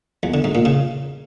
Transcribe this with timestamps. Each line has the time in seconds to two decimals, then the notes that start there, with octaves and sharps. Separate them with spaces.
0.23 E2
0.34 D3
0.44 G#2
0.55 A#2
0.65 C#3